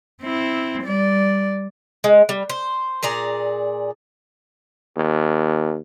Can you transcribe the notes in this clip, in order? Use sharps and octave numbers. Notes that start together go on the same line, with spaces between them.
C4 E4
G3 D5
G#3
G3
C5
A#2 G#4 D5 A#5
D#2